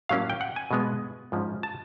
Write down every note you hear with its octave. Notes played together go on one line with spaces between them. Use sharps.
A2 F#3 A#3 C#4 F5
G5
F#5
G#5
B2 G#3 B3
G#2 F3 G#3 C#4
A5